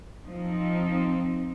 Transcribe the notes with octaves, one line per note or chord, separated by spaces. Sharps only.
F3 C4 D#4